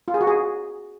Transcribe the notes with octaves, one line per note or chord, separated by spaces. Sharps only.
F4
G#4
F#4
G#4